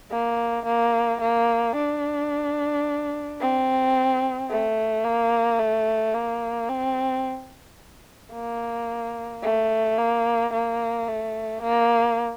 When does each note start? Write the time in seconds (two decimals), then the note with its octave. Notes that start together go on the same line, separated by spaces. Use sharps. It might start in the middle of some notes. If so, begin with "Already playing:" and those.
0.12 A#3
0.66 A#3
1.21 A#3
1.76 D4
3.40 C4
4.50 A3
5.05 A#3
5.59 A3
6.14 A#3
6.69 C4
8.33 A#3
9.43 A3
9.98 A#3
10.53 A#3
11.08 A3
11.62 A#3